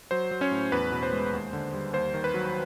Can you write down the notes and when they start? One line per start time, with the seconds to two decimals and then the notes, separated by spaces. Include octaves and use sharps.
0.11 F#3 C5
0.31 F#3
0.41 C#4 C#5
0.51 A2
0.72 E2 B4
0.92 B2
1.03 C5
1.13 G#3
1.33 D#2
1.53 D3
1.74 G3
1.93 D#2 C5
2.14 D#3
2.24 B4
2.34 F#3